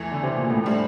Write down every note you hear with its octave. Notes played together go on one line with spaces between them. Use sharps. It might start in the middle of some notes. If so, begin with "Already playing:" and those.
Already playing: E2 E3 A3
D3
C3
A#2
A2
A2 D3 G3 C4